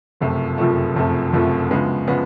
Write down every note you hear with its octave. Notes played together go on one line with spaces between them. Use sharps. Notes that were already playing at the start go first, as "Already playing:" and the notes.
F#1 F2 C3 F3 A3
F#1 F2 C3 F3 A3
F#1 F2 C3 F3 A3
F#1 F2 C3 F3 A3
D2 C#3 F3 G#3 B3
C#3 F3 G#3 B3